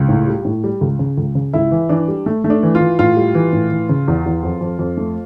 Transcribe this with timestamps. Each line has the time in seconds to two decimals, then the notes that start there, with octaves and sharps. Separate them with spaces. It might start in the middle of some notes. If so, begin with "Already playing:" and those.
Already playing: C#2
0.09 A2
0.28 G3
0.45 A2
0.64 G3
0.81 C#2
0.99 C#3
1.17 C#2
1.35 C#3
1.53 C#2 E4
1.71 E3
1.89 E3 D4
2.08 G3
2.26 A3
2.44 A3
2.50 D4
2.63 E3
2.75 F4
2.81 E3
2.99 A2 F4
3.16 G3
3.35 E3
3.53 A2
3.71 E3
3.89 C#3
4.08 E2
4.26 E2
4.43 F2
4.61 F2
4.79 F2
4.97 A3